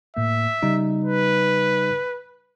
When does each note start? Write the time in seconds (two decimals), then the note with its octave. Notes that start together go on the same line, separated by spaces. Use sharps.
0.17 A2 A#3 E5
0.63 C#3 G3 D#4
1.04 B4